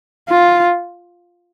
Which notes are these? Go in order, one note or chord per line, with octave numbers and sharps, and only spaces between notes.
F4